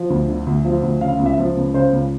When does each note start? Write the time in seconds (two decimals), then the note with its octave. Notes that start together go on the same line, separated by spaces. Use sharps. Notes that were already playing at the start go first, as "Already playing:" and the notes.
Already playing: F3
0.10 D2
0.28 D3
0.46 D2
0.65 F3
0.83 D2
1.01 C#3 F5
1.19 C#2
1.26 E5
1.38 F3
1.57 C#2
1.74 C#3 C5
1.93 C#2